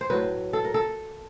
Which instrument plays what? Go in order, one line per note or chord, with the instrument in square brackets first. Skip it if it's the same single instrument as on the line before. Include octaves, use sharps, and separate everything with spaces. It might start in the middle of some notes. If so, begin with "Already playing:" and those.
[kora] C5
A2 F#3 B4
A4
A#4
A4